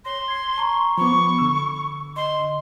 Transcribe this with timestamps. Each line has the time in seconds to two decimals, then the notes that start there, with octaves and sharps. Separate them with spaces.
0.05 C#5 C6 A#6
0.28 G#6 C7
0.57 A5 A#5 C#6
0.98 F3 B3 B5 C#6 D6
1.39 D3 E6
2.16 D#5 C6